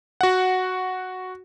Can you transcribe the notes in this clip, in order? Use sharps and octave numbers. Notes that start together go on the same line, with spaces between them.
F#4 F#5